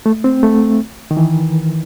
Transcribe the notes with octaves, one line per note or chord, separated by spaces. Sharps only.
A3
C4
A3
D#3
E3